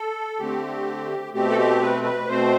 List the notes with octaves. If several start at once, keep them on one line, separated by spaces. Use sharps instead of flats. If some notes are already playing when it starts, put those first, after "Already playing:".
Already playing: A4
D3 A3 C4 G4
B2 A3 C4 G4
A4
G4
B4
B4
B2 A3 C4 C5